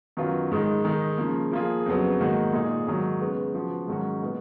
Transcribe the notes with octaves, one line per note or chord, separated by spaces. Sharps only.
F#2 D#3 F#3 B3 F4
G#2 D#3 G#3 D#4
D#3 G#3 D#4
C#3 F3 A#3
F3 A#3 F4 G#4
F2 C#3 F#3 B3
G#2 D#3 A#3 D#4 F#4
A#2 G#3 D#4 G#4
G#2 D#3 F#3
C#3 G#3 B3
C#3 F3 B3 F#4
G#2 D#3 F#3 C#4 F#4
A#2 G#3 B3